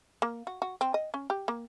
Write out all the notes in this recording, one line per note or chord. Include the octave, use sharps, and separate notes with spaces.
A#3
F#4
F#4
C4
D#5
C#4
G4
A#3